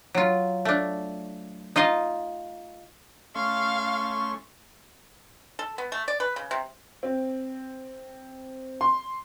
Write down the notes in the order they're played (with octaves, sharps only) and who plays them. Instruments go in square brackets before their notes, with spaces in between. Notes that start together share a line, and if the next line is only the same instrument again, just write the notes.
[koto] F#3 F4
A3 D4
D#4 F4 D#5 F5
[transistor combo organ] A3 C#4 [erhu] F5 [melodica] C6 C#6
[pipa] A4
B3
A3
D5
B4
C#3
C3
[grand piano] C4
C6